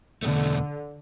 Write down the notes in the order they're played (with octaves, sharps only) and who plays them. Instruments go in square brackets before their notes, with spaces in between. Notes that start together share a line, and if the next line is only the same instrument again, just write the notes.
[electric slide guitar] E2 B2 A3 [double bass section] D3